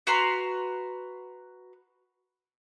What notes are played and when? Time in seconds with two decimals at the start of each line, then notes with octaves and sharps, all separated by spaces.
0.07 F#4 B4 A#5 C6